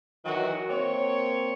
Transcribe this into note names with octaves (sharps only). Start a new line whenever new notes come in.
D#3 E3 F#3 F#4
A#3 C4 C#5